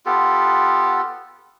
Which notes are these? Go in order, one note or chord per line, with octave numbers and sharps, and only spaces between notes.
B3 F4 G4 A4